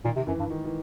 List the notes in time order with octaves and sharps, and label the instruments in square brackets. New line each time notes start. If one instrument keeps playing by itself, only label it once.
[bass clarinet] A#2 [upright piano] D#3
[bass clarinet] C3
[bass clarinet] F#2 [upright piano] E3
[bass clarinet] G2
[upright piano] D#3
E3